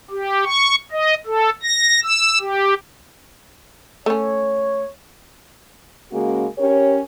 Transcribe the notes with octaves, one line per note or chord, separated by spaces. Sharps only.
G4
C#6
D#5
A4
A#6
E6
G4
A3 C#4 C#5
C#3 G#3 A#3 C#4 F#4
C#4 G4 A#4 C#5